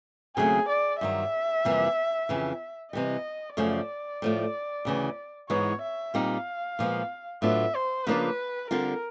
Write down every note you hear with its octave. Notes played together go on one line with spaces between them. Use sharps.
D#2 C#3 F#3 A3 C4 G#4
D5
G2 D#3 F#3 E5
F2 C3 E3 G3 A#3
F2 C#3 E3
C3 E3 G3 D#5
F#2 C#3 F3 A3 C#4 D5
A2 F3 A3
D2 C#3 E3
G#2 E3 G#3 B3 D#4 C#5
E5
A#2 G3 C4 D#4 F5
A#2 F3 G#3 B3
A2 F#3 B3 D4 F4 E5
C5
C#3 F3 A#3 D4 F4 B4
D3 G3 C4 F4 A#4